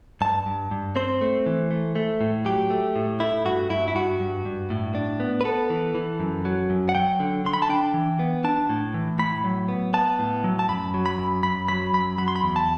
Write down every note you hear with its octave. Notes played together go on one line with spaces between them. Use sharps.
G2 A5
G2
G2
C4 C5
A3
E3
A3
A3
A2
F#3 G4
A3
A2
A3 E4
G2 F#4
G2 E4
E4
G2 F#4
G2
G2
A2
D4
B3
B4
B3 A4
E3
E3
F#2
F#3
F#2
F#5
F#3 G5
D3
D3 C6
B5
A5
D4 G5
E3
B3
D4 A5
A2
E3
A2 B5
F#3
B3
B3 A5
A2
F#3
A5
F#2 B5
F#3
B5
F#2
F#2 B5
F#3 B5
F#2 B5
F#3 B5
C6
B5
E2
A5